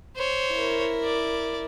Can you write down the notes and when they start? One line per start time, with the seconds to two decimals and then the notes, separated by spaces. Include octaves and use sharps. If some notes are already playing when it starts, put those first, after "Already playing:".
0.16 C5 C#5
0.53 E4 A#4
1.04 D5